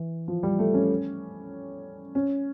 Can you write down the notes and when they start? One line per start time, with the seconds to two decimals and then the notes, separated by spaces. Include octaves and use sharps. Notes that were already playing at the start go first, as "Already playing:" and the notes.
Already playing: E3
0.28 F3
0.43 G3
0.59 A3
0.74 C#4
2.15 C#4